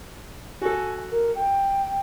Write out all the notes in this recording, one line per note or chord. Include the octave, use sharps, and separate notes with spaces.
F#4 A4 G#5
A#4
G5